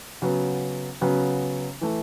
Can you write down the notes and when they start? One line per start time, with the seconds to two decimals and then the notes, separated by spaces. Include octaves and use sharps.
0.22 C#3 F#3 B3
1.01 C#3 F#3 B3
1.81 E3 A3